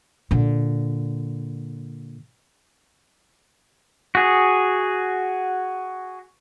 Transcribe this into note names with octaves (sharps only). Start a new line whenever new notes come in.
A#2 D3
F#4 G#4